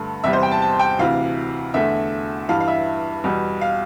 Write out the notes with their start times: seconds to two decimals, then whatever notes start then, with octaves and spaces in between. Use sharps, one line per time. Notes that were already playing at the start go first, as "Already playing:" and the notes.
Already playing: G2 D3 A3
0.24 E2 C3 G3 E5
0.33 C5
0.43 G5
0.51 A5
0.62 A5
0.79 G5
0.99 D2 C3 E3 F5
1.74 E2 D3 A3 E5
2.49 G2 E3 G3 F5
2.60 F5
2.68 E5
3.24 E2 B2 G3
3.61 F5